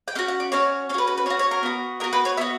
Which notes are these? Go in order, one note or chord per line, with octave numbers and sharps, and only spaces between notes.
G5
C#4 F#4 F#5
F#5
D5
C#4 F#4 C#5
C#4 F#4 B4 C#5
B4
B4
C#4 F#4 C#5
C#5
A#4
B3 F#4
B3 F#4 A#4
B4
C#5
B3 F#4 E5